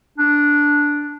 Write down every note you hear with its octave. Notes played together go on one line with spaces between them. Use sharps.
D4